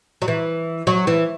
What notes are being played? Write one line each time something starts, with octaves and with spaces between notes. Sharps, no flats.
F#3
E3
F#3
E3